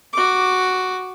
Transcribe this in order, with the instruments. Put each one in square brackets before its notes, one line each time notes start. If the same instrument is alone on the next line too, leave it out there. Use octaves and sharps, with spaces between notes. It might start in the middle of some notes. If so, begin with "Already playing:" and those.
[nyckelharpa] F#4 D6